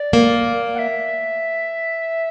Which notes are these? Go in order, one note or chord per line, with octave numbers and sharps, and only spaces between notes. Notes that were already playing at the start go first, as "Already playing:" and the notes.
Already playing: D5
A#3
F#5
E5